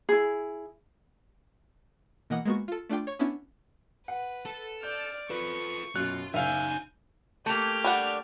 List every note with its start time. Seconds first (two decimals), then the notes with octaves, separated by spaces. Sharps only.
0.09 E4 G#4
2.30 B2 E3 A#3 D#5 F#5 D#6
2.45 G#3 A#3 B3 F#4 C#6
2.68 F4 A4
2.90 A3 D4 F4 G5 D6
3.07 C#5 C#6 G#6
3.19 B3 C#4 D4 E4
4.08 B4 F#5
4.46 A4
4.83 D5 F6 G6
5.30 F4 A4 B4 C#6
5.96 F#2 B2 F4 F5 F#6
6.34 F#1 D#4 D5 E5 F5 G#5 G6 F7
7.46 A3 A#3 G4 F6
7.84 G3 D4 F#5